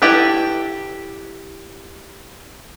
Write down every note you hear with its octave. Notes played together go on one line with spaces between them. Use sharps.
E4 G4 A4 B4